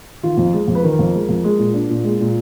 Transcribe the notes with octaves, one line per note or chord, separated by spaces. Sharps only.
D#3 F4
F2
G#3
F2
B4
D#3 A#4
F2
G#3
F2
G#3
A#2
D4
A#2
G#3
A#2